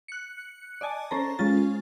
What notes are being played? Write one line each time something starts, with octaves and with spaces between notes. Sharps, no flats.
F#6 C#7
D5 D#5 G#5 A5
C#4 A4 C5 A#5
G#3 C#4 F4 A6